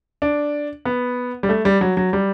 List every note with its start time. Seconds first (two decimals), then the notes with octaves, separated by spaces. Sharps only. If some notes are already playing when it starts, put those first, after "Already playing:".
0.22 D4
0.85 B3
1.43 G3
1.49 A3
1.65 G3
1.81 F#3
1.97 F#3
2.13 G3